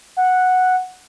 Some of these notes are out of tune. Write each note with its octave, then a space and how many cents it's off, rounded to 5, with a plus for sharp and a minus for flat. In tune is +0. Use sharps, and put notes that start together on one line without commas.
F#5 -5